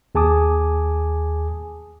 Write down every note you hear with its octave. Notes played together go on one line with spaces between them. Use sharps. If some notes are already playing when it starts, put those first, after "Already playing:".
D#2 G#4 G#5 A5 D6 D#6